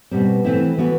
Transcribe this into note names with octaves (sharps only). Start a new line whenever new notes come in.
B2 G3 C4
E3 A3 C4 E4
E3 B3 F#4